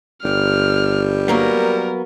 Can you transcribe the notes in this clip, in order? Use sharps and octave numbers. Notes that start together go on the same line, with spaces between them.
G1 G3 F6
F#3 A#3 B3 A#4